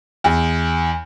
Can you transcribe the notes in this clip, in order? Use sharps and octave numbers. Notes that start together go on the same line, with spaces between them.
E2